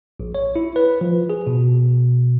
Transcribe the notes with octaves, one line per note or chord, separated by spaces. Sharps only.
A#1
C#5
E4
B4
F3
G#4
B2